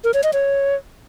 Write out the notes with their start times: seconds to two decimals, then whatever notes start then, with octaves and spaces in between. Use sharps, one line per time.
0.04 A#4
0.14 C#5
0.23 D#5
0.33 C#5